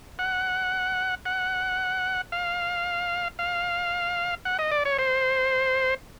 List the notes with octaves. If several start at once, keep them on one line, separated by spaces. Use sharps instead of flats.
F#5
F#5
F5
F5
F#5
D#5
D5
C#5
C5